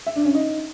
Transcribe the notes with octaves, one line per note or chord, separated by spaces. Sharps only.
E5
D4
C#4
D#4